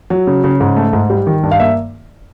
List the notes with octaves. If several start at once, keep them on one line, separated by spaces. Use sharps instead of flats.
F#3
C#3
C#3
G#2
A3
G#2
G3
D#3
G2
F5
A#3 E5